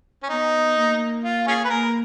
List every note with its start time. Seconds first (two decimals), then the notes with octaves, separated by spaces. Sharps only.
0.23 C#4
0.29 B3 D#4
0.76 A#3
1.24 F4
1.47 C#4 F4 G#4
1.65 B4
1.70 A#3 A#4